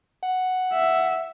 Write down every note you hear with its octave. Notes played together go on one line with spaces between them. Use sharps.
F#5
E5